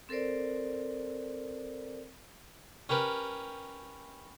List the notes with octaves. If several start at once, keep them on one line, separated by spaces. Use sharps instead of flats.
C4 A4 A#4 C5 D5
C#4 G4 A#4 B4